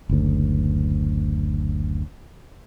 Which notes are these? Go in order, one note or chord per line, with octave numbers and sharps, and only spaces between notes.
F#1 D2